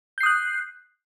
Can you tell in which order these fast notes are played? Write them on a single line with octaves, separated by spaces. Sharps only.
G6 C7 D#6 F#6